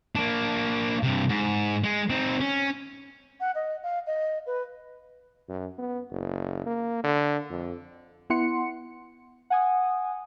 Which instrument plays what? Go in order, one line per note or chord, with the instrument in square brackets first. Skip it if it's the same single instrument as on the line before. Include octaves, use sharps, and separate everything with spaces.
[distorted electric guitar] A#3 D4
G2 C3
G#2
G#3
C4 D#4
C#4
[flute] F#5
D#5
F5
D#5
B4
[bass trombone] F#2
B3
F#1
A#3
D3
F2
[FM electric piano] B3 E4 F#5 C6 C#7
[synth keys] F#5 G#5 D#6